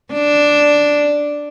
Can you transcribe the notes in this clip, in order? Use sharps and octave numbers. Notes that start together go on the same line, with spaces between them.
D4